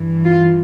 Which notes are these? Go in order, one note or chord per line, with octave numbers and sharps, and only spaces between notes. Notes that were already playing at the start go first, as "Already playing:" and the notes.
Already playing: G2 E3
F4